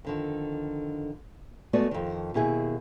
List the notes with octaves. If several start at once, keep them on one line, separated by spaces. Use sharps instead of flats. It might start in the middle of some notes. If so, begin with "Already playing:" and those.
F2 D3 D#3
G#3 A3 B3 F#4 D5
F2 D#3
D#2 B2 E4 G#4